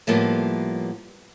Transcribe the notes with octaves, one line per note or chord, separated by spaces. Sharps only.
A2 F3 G3 A#3 B3